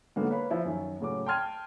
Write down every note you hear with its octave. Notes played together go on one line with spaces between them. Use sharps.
G#2 D3 F#3 A#3 B3
A#4 B4 C#5 F5 B5
F3 E4
F#2 D#3
A2 C#3 F#3 D6
G5 A5 C6 F6 G#6 D#7